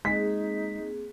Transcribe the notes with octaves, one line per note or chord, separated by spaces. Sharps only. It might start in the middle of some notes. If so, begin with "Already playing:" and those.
G#3 A#3 C4 D#4 G#4 B6